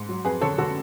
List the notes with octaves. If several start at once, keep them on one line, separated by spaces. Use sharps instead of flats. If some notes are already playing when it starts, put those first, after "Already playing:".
Already playing: G#2
F#3
F2 G#4 B4
D3 A4 C#5
D3 F#4 A4